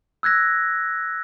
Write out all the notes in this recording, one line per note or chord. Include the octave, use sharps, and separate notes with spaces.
E6 F#6 G#6 A#6